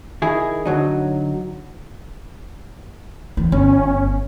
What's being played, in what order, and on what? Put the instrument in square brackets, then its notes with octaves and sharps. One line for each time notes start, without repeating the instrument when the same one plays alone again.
[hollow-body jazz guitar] D#3 E4 G#4
D3 F#3 D#4
[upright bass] E3
[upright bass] G1 [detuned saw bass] C#4